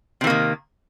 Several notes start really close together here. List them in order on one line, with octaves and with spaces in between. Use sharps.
C3 E3 A#3 D#3